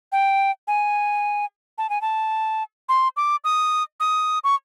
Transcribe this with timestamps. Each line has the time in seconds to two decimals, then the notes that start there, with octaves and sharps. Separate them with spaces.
0.12 G5
0.67 G#5
1.78 A5
1.90 G#5
2.01 A5
2.89 C6
3.17 D6
3.44 D#6
4.00 D#6
4.44 C#6